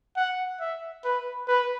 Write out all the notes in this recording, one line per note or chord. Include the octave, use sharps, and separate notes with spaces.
F#5
E5
B4
B4